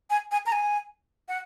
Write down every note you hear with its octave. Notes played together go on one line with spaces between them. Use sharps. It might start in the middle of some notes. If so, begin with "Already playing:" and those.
G#5
G#5
A#5
G#5
F#5